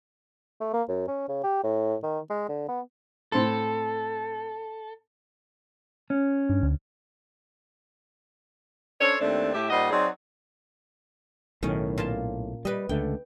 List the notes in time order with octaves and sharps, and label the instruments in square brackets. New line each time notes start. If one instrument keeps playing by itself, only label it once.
[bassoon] A3
A#3
F#2
C#4
C#3
G4
A2
D#3
G#3
D3
B3
[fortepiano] A2 C4 C6 [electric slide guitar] A4
[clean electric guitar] C#4
[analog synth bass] G2
D2
[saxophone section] C#4 D4 A4 C5 C#5
D#2 A3 C4 D4
A2 G4 E5
A#2 G3 D#4 C5 D#5 F#5
F#3 C4 D#4 F#4 G#4 D5
[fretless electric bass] B1 A2 [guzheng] D#3 C#4
[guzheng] A#2 F4 A5
[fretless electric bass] G3 [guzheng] B4 D#5
[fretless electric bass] C#2 D3 A3 [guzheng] G5